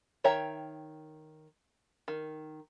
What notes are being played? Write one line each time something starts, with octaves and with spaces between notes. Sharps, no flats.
D#3 C#5 E5 G5 A#5
D#3